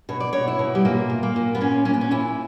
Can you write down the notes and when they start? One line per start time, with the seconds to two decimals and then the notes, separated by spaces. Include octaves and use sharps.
0.09 B2 C#5
0.20 D5
0.33 B2 C#5
0.47 E4
0.59 B2
0.75 G3
0.85 A#2 A#3
1.10 A#2
1.23 A#3
1.36 A#2
1.55 B3
1.61 A#2 C#4
1.85 A#2 C#4
1.94 B3
2.01 C#4
2.11 A#2 E4